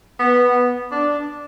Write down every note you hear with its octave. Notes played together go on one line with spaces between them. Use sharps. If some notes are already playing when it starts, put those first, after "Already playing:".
B3
D4